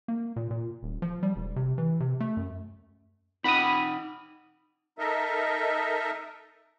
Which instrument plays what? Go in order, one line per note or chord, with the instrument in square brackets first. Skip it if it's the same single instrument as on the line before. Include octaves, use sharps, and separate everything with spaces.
[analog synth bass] A#3
A#2
A#2
D#1
F3
G3
E1
C3
E3
C3
A3
F#2
[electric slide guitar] D#4 F#5 G5 [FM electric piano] B5 D#6
[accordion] D#4 A4 A#4 D#5 E5